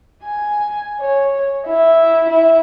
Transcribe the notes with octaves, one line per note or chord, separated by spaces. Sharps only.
G#5
C#5
E4
E4